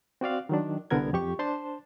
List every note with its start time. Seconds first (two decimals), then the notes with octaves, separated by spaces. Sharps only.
0.21 C4 F#4 D5 F5
0.49 D#3 F#3 D4
0.91 C2 D3 B3 A#4 G#6
1.13 F2 G4 C#6
1.39 D4 C5 A5 C6